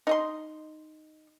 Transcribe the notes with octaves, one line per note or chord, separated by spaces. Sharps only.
D#4 D#5 C6